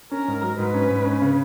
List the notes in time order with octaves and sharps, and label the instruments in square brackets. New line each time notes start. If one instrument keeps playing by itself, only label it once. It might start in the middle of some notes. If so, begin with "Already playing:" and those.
[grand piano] C#4 [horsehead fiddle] A#4
[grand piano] G#2
F#3
[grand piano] G#2 [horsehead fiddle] B4
[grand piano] C#4
G#2
C#4
C#3